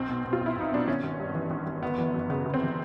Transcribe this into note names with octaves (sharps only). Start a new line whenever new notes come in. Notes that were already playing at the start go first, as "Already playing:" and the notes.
Already playing: B1 C4
B2
B2
F4
B1
E4
B1 D#4
B2 D4
G#1 C#4
G#1
G2
E3
G#1
G#1
G1 B3
E3
F#2
C#3 B3
G1
C4
E3